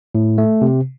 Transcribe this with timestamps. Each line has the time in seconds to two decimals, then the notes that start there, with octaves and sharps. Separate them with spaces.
0.15 A2
0.38 A3
0.62 C3